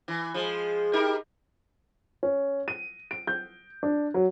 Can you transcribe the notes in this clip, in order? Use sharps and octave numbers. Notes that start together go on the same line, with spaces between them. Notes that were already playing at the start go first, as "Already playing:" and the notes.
E3
F3 G#3
D#4 G4 A#4
C#4
D#7
D7
G6
D4
F#3